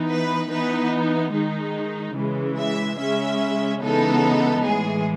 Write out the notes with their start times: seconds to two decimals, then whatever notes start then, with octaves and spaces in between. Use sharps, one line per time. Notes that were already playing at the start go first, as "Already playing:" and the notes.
Already playing: E3 B3 D#4
0.09 B4
0.50 E3 B3 D#4 B4
1.33 D#3 G#3 D#4
2.16 C#3 E3 G#3
2.57 E5
2.99 C#3 G#3 C#4 E5
3.82 C#3 E3 G#3 B3 D#4 A4
4.64 A2 E3 G#3 G#4